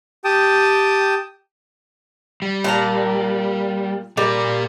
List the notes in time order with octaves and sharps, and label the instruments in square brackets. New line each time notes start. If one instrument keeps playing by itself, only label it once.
[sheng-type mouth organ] G4 G5 A5 D#6
[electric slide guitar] G3
[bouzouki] A#2 A5 A#5
[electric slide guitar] A#2 A#4 [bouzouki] G3